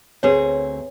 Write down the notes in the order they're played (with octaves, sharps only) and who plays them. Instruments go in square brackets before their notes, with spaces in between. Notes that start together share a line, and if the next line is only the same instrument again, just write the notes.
[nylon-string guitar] D2 C4 G#4 [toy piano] B4 C#5